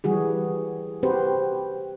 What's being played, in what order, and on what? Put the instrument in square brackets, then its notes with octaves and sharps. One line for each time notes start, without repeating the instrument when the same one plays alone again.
[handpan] E3 G3 F#4 G#4
C4 F#4 G4 B4 C5